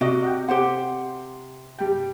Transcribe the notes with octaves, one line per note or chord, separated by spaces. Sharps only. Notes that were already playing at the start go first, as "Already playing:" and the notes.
C3 F#4 D5 D#5
F#5 G5
G4 C5 F#5 C6
G2 G3 G5